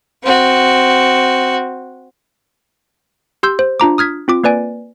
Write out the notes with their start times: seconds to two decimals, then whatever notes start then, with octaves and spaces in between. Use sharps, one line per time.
0.24 C4 F#4
3.43 G4 C6 E6 G6
3.59 C5
3.80 D4 F4 A#5 D6
3.98 D#6 F6 G#6 B6
4.28 C4 F4 D6
4.44 A#3 B4 D5 G#5 D7